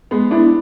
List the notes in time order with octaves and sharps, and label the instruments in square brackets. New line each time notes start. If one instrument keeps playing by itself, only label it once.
[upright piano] G#3 B3
[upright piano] B3 D4 [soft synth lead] E4